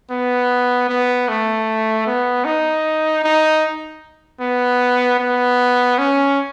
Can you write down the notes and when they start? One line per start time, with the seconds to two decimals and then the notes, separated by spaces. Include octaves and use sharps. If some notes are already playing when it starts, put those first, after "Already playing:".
0.11 B3
0.89 B3
1.29 A3
2.07 B3
2.45 D#4
3.24 D#4
4.41 B3
5.19 B3
5.98 C#4